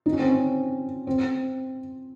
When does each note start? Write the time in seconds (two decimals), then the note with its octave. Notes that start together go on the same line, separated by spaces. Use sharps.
0.06 D#4
0.12 C#4
0.19 C4
0.27 C#4
1.07 C4